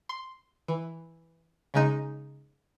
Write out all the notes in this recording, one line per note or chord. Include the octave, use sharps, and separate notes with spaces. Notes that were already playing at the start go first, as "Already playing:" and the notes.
C6
E3
C#3 G#3 D#4